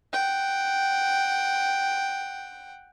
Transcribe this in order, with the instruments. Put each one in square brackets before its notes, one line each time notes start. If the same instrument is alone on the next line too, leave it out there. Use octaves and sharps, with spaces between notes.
[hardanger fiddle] F#5 G5